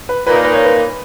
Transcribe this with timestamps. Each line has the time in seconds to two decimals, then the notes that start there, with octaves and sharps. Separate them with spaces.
0.09 B4
0.27 A#2 A#3 D#4 B4
0.44 B4
0.54 C#5
0.65 B4